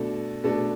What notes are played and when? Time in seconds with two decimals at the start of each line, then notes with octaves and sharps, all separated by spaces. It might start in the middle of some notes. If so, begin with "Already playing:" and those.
Already playing: B2 A3 D4 A4
0.44 B2 A3 D4 A4